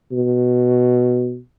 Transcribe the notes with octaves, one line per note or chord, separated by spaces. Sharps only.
B2